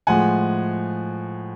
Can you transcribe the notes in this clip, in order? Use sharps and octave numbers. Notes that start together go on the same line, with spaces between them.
A2 F3 G#3 F#5 G#5